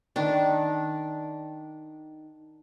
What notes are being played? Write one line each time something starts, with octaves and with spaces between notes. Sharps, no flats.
D#3 D4